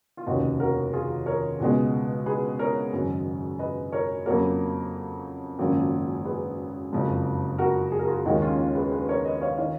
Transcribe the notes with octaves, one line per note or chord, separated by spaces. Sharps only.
F4
F1 D#2 C#3 D#4 F#4
F#4 A#4
F4 G#4
A#4 C#5
C#2 B2 G#3
G#4 B4
A#4 C#5
G#1 F#2 C#3 G#3
B4 D#5
A#4 C#5
F2 C#3 F#3 A#3 A#4 C#5
G#1 F#2 C#3 F3 A#3
G#4 B4
F#1 F2 F3 G#3
F#4 A#4
G#4
A#4
F4 G#4
D#2 D#3 G#3 D#4 F#4
C#4 F4
G#4 B4
G#4 B4
A#4 C#5
B4 D#5
C#5 F5
D#3 C#5 F5